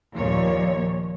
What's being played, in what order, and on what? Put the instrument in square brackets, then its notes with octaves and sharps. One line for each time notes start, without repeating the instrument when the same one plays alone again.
[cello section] D#2 A#2 F3 C#5